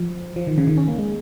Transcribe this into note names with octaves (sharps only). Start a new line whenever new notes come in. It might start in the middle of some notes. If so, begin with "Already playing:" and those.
Already playing: F3
F3
D#3
C#3
D#3
C#4
A#3
G#3